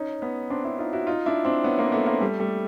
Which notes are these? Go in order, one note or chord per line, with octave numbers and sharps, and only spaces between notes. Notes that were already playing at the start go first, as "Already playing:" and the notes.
Already playing: C#4 D#4
B3 C#4
C4 D4
D4 E4
D#4 F4
E4 F#4
D#4 F4
D4 E4
C4 D4
B3 C#4
A#3 C4
A3 B3
A#3 C4
G3 A3
G3 A3